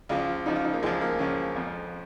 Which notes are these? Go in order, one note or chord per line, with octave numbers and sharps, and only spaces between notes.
C#2 C#3 F3 F4
C#2 C#3 F3 D#4
F4
D#4
A#3
C#2 C#3 F3 G#3
A#3
C#2 C#3 F3 C#4
F2 F3